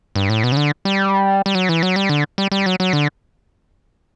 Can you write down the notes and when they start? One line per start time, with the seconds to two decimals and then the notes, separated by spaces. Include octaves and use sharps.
0.16 G2
0.29 A2
0.44 B2
0.52 C#3
0.57 D3
0.85 G3
1.46 G3
1.55 F#3
1.69 E3
1.83 F#3
1.96 G3
2.09 D3
2.38 G3
2.52 G3
2.66 F#3
2.80 F#3
2.93 D3